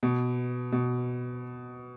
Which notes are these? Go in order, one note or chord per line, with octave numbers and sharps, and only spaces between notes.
B2
B2